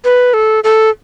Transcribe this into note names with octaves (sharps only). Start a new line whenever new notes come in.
B4
A4
A4